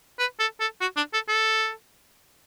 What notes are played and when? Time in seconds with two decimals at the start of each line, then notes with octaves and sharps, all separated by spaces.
0.19 B4
0.40 A4
0.60 A4
0.81 F#4
0.97 D4
1.14 A4
1.29 A4